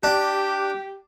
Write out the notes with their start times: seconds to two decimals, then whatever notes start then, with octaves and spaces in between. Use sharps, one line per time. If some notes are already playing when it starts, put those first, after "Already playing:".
0.03 D4 G4